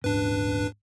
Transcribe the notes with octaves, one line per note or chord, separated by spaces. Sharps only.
D#1 G#2 C#4 D4 B4